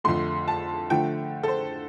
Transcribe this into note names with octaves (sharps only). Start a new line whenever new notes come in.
F2 D3 A3 C6
A5
D3 F3 A3 G5
A4
C5